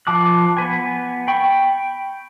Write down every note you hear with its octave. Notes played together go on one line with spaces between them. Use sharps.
F3 A5 D6 F#6
B3 B4 G#5
G5 B5 C#6